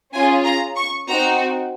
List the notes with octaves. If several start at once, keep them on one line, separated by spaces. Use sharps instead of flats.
C#4 F4 G#4 G#5
A#5
C#6
C4 D#4 F#4 A#5